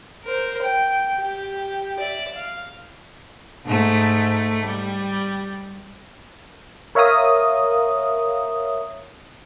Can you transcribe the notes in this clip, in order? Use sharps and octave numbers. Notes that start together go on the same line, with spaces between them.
A#4 C5
G5
G4
D5 E5
F5
G#2 A3
G3
A#4 C#5 E5 F5 A#5 D#6